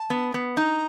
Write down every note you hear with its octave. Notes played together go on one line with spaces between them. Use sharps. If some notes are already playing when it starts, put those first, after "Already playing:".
Already playing: A5
B3
B3
D#4 A#5